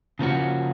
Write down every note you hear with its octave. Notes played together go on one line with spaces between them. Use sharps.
C#3 F3 A#3 C#4 F#4